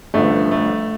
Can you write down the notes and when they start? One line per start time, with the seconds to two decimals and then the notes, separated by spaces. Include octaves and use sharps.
0.14 A1 G2 D3 F3 A3
0.51 A3